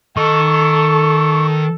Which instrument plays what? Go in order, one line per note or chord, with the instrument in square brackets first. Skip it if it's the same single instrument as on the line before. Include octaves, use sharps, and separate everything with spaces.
[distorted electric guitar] D#3 D#5 [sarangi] A4 [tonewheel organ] C#6